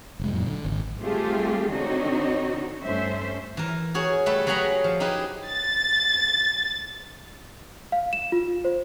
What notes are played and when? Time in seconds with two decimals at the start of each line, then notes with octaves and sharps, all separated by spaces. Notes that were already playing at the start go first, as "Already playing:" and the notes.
0.19 F1 G#3
0.33 F#2 A#2
0.46 D3
0.65 G#1
0.99 G3 A3 C4 F4 G4 G#4
1.68 D3 C4 D#4 F#4 C#5 D#5
2.83 G2 A3 C#4 C5 E5
3.57 E3 A#4
3.94 F#4 G#4 C#5
4.26 G3 A3 B4 E5
4.47 F#3 F#4 G#4 F#5 A#5 B5
4.84 F3
5.00 D#4 E4 G4 G#4 B4
5.47 A6
7.92 F5
8.13 E7
8.32 F4
8.65 C5